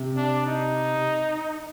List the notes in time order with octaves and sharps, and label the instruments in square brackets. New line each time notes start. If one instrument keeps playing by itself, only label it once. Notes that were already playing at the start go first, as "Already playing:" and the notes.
Already playing: [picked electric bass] C3
[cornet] D4
D#4